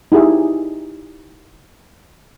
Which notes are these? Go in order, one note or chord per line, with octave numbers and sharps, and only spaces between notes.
D#4 E4 G4 G#4 E5